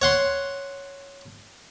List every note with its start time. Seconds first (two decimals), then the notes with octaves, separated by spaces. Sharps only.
0.02 C#5 F#5 C6